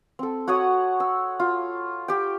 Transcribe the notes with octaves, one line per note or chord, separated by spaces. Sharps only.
C4 A4
F#4 C#5 F#5 D#6
E6
F4
G4 G5